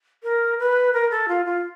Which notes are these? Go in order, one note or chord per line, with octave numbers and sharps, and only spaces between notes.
A#4
B4
A#4
A4
F4
F4